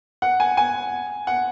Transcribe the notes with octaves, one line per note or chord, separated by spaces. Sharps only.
F#5
G#5
G#5
F#5